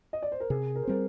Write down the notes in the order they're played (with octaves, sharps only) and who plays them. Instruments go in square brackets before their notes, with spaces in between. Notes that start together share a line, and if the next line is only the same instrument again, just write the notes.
[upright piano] D#5
D5
C5
A#4
[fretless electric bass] C3 [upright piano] G#4
[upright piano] A#4
C5
[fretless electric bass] G3 C4 [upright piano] A#4